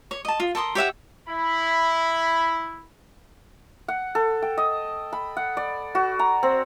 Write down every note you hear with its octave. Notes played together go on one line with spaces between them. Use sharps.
C#5
D#5 A5
F4
A4 A#4 C6 D#6
G4 C#5 E5 F#5
E4 B5
F#5
A4
G5
D#5
B5
F#5
D5
F#4
A#5
C4